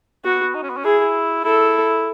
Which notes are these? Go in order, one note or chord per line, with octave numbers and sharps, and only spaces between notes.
B3 F#4
D#4
C#4
B3
C#4
E4 G#4
E4 A4